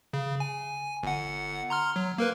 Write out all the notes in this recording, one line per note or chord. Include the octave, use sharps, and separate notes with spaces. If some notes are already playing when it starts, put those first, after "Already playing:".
C#3
G#5
G1 F#5
A#5 C6 F6
F#3
A#3 A#4 B4